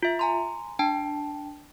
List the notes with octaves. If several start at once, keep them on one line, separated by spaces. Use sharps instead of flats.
F4 E5
G#5 A#5 C6
D4 G5 A5